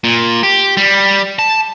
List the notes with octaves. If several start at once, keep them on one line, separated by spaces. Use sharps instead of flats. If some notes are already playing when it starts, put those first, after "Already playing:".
A#2
G4
G3
A5